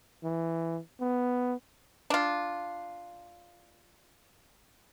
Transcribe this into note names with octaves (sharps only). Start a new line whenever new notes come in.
E3
B3
D4 F4